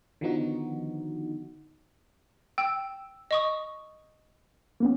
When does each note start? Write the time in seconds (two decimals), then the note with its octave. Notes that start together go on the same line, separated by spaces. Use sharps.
0.21 D3 D#3 F3 B3 D#4 F#4
2.58 G5 E6
3.31 D#5 C#6 D#6
4.80 A#3 B3 C#4